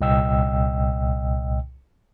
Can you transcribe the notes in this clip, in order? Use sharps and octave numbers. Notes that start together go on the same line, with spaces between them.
C2 A#2 D#5 G5 E6